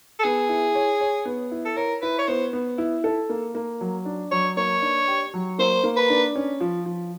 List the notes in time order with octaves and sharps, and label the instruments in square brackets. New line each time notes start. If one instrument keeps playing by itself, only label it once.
[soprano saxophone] A4
[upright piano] B3 [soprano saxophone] G#4
[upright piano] E4
C#5
C#5
B3
E4
[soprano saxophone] A4
[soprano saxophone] A#4 [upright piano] C#5
[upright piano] E4 [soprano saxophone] B4
[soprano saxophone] C#5
[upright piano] B3 [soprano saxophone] C5
[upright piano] B3
E4
A4
A#3
A#3
F#3
D4
[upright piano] F#3 [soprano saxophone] C#5
[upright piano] A#3 [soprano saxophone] C#5
[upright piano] D4
G4
F#3
[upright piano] A#3 [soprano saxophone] C5
[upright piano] A#3
[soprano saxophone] B4
[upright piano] D4
C#4
F3
F3